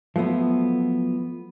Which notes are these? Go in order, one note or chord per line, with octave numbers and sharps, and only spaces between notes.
F3 F#3 A3 B3